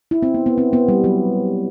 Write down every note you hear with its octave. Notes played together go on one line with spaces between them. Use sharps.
E4
C4
B3
B3
C4
B3
G3
F#3